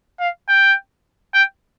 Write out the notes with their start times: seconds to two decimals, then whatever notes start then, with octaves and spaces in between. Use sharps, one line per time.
0.20 F5
0.49 G5
1.34 G5